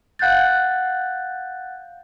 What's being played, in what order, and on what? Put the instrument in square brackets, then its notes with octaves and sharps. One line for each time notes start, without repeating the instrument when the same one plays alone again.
[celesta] F5 F#5 F#6 G6 A6